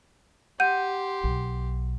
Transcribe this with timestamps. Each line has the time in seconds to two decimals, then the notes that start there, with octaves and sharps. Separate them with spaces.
0.60 G4 F#5 C6 G6 D#7
1.24 B1